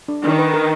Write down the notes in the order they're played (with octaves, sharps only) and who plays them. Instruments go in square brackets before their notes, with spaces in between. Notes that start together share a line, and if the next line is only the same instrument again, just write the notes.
[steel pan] D4
[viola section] D#3 [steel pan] D4
[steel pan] B4
A#4